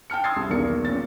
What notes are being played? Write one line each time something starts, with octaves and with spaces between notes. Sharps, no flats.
G5 A5 F6 C#7
C6 D#6 E6 G#6 A6 C7
C2
B1 E2 D#3 A#3 C#7
A#2 C#4 A6